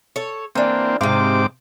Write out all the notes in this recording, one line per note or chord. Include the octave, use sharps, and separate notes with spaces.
A4 C#5
E3 A#3 C4 D4
G#2 C3 C4 F5 D6